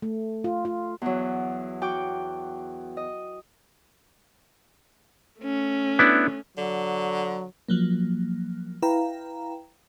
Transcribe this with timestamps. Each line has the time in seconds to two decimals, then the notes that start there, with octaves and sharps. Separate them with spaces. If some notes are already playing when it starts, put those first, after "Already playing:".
0.02 A3
0.44 F4
0.65 F4
1.02 E2 F#3
1.82 F#4 G5 D6
2.97 D#5
5.40 A3 C#4
5.99 B3 D4 E4
6.58 D3 F#3
7.69 F3 F#3 A#3
8.82 E4 B4 F5 G5 A#5